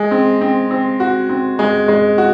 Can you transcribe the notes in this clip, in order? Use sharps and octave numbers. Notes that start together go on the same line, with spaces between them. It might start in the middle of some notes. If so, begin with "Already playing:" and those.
Already playing: G#3
C4
C4
C4
F#4
C4
G#3
G#3
F#4